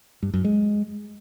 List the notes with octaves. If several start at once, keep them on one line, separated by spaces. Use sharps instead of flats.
G2
F#2
G#3